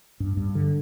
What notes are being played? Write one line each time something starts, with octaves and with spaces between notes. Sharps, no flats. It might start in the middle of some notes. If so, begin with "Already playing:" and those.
G2
G2
D3